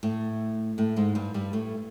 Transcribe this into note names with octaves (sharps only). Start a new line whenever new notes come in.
A2 A3
A2 A3
G#2 G#3
G2 G3
G2 G3
A2 A3